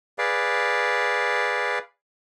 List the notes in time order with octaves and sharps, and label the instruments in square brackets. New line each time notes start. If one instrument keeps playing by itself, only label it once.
[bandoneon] G#4 B4 D5 F5